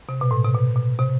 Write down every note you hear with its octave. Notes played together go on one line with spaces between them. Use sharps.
C3
B2
A2
C3
B2
B2
C3